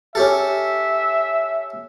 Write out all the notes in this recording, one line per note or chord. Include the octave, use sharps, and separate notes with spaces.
C#4 G4 A4 E5